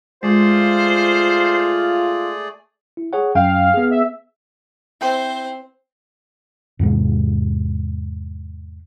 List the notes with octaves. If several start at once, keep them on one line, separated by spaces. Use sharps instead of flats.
G#3 A3 F4 G#4 C5 D5
E4
G#4 C#5 F#5
F#2 F5 G5
B3 G#4
E5
C4 E4 C5 G5 C6
E2 G#2 C3 G#3